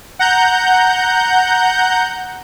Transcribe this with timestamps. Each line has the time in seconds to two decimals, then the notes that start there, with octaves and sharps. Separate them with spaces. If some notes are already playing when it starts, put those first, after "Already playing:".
0.19 F#5 A#5 G6